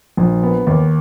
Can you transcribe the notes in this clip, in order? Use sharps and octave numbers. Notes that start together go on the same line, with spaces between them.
A#1
B3
D#2